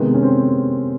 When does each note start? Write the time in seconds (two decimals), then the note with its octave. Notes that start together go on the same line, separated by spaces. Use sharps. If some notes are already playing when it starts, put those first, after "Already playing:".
Already playing: C3 D#3 G#3 B3
0.15 C#4
0.23 C4